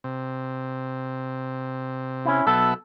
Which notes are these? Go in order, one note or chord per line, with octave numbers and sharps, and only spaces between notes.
C3
C#4 E4
B1 B2 A4 B4 E5 F#5